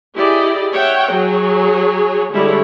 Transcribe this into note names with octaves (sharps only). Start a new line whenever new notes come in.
E4 G4 G#4 D5 D#5
C#5 E5 F#5 G5
F#3 G#4 C#5
D3 G3 G#3 E4 C#5